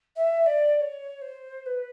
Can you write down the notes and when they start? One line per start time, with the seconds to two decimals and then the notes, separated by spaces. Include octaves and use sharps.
0.15 E5
0.46 D5
0.75 D5
0.80 C#5
1.21 C5
1.66 B4